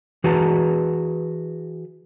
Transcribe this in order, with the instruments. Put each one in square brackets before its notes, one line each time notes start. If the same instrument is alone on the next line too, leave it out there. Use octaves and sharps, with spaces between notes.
[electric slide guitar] E3 F#4 G#4 B4 A5 A#5